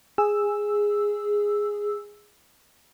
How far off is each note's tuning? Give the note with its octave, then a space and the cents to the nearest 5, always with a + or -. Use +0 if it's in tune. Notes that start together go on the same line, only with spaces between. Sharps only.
G#4 -5 E6 +0